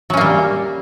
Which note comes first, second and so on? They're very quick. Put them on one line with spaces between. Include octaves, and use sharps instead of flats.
F#3 C#4 A#3 G3